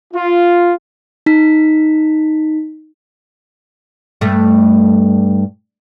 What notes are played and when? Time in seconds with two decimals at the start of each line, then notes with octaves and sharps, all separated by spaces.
0.14 F4
1.26 D#4 B6
4.21 G2 A3